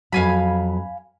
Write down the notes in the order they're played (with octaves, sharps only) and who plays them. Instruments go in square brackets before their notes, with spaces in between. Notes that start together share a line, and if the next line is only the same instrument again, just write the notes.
[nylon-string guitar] F2 F#3 [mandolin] F5 G#5 B5